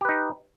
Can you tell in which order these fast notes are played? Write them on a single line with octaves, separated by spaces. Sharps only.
G4 B4 D#4